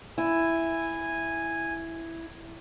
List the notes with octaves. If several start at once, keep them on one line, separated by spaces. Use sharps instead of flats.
E4 G#5